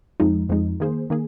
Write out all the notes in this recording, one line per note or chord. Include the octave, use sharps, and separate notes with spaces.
F2 F3 G#3 D#4
F2 F3 G#3 D#4
D#3 A#3 G#4 C5
D#3 A#3 G#4